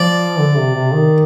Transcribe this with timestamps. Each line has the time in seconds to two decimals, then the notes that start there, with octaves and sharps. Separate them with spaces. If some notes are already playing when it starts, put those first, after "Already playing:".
Already playing: F3 D5
0.39 D3
0.58 C3
0.75 C3
0.93 D#3